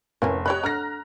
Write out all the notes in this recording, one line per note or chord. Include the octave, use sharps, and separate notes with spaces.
F1 E3 A#3 C#4
G4 C#5 D#5 B5 F#6
D3 A#5 F6 A#6